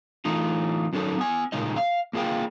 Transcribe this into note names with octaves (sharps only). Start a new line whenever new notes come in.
E3 A3 D#4 F4
F#3 C#4 D#4 A4
B3 G#5
A#2 C#3 G#3 D#4 D#5
F5
A#3 F4 G#4 F5 G5